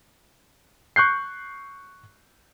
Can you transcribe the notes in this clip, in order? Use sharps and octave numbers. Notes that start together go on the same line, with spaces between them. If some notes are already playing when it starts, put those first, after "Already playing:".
C#6 F#6 G6 C7